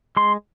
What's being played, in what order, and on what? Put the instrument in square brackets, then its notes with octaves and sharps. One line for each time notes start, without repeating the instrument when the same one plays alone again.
[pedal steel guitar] G#3 C6